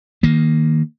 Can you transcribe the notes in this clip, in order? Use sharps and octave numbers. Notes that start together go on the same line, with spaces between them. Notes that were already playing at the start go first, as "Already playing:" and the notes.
D#3 A#3